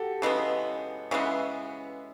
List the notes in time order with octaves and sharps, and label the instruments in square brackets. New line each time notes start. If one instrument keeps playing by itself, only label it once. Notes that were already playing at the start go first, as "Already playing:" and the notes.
Already playing: [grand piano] F#4 G4 A4
[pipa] C#3 E3 G#3 B3 [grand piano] D#5
[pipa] C#3 E3 G#3 B3 [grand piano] E5